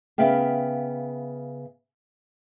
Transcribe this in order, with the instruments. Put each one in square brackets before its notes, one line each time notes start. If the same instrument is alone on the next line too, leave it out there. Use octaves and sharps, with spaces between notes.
[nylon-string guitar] C#3 B3 E5 F5 G5